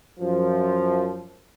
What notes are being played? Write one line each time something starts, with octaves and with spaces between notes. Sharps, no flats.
F#2 F3